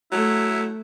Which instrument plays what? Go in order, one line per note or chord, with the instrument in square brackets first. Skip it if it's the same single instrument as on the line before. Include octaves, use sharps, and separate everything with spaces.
[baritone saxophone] F#3 [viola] A3 [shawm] E4